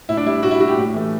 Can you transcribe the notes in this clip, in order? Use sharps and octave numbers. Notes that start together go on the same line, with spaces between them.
A2 E4
D4
G3 E4
A2 F#4
E4
G3 F#4
G4
A2
E3 A3